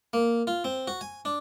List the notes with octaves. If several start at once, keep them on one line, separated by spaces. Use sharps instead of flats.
A#3
F4
C4
F#4
G#5
D4